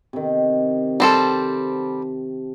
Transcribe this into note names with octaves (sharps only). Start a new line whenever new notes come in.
C3 D#3
G3 C4 A4 A5